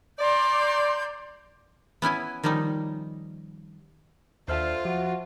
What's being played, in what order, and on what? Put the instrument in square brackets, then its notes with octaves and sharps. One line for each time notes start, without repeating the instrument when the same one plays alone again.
[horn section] D5 [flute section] A#5 C6 G6
[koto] B3 C#4 E4 G#5
D#3 F3 G3 C#4 D#4
[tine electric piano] D#2 F6 [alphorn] D3 [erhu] F4 [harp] C5 E5 A5
[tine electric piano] F3 [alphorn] F#4